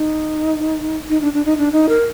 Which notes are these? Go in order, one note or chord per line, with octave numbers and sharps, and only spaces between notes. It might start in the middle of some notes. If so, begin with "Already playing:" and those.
Already playing: D#4
D#4
D4
D4
D#4
D4
D#4
A#4